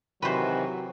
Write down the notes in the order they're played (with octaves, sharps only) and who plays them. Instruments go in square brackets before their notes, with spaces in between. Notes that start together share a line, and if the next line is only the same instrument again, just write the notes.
[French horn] C3 [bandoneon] D#3 E3 F#4 [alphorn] F#3 [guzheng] B4 C5